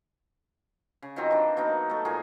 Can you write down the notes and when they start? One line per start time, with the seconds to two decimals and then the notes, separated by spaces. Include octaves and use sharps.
1.02 C#3
1.16 D#3 F3 F#3 C4
1.31 E3 D4
1.57 F#3 A#3 B3 D#4
1.90 A3 A4
2.05 A#2 F3 A#3 G#4